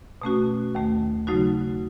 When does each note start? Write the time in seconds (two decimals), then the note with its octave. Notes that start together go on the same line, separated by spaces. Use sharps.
0.22 B2 A3 C#4 F#4
0.75 D#2 D#3 A3
1.27 C#3 F#3 A3 D#4 F#4